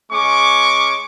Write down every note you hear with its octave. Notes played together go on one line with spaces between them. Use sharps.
G#3 C#4 C#6 D6